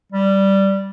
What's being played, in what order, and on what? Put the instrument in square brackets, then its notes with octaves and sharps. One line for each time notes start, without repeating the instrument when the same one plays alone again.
[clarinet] G3